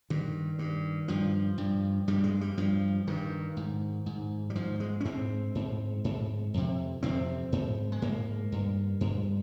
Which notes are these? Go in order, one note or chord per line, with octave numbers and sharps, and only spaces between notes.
G2 D#3
G2
G2 F3
G2
G2 G3
G#3
G3
G2 F3
G2 D#3
G#2
G#2
G3
G#2 F3
G#3
C#4
G#2 C4
G#2
G#2
F2 C3
F2 C3 C4
G#2
G#3
G#2 A#3
G2
G2